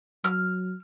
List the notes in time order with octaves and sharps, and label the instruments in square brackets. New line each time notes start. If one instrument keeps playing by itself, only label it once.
[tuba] F#3 [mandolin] F6